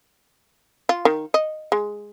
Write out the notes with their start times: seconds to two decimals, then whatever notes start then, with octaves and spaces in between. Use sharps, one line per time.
0.89 F4
1.05 D#3
1.34 D#5
1.72 G#3